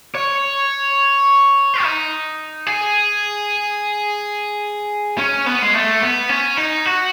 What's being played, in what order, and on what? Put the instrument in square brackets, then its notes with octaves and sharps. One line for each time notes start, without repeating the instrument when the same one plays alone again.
[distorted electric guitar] C#5
D#4
G#4
C#4
B3
G#3
A3
B3
C#4
D#4
F#4